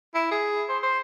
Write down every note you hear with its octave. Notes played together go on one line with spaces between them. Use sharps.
E4
G#4
C5
C5